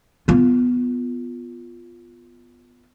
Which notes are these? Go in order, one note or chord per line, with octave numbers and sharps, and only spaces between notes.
B3 F4